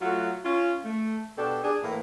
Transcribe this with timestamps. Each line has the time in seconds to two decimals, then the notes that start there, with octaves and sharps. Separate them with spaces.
0.01 F#3 A3 F4 F#4
0.44 C#4 F4
0.85 A3
1.37 B2 D4 G4 A4
1.64 D4 G#4
1.82 A2 E3 A#3